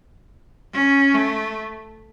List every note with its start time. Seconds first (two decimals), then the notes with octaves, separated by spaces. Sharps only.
0.74 C#4
1.14 A3